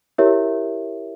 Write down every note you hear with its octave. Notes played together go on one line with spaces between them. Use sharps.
E4 G4 A#4 C#5 E5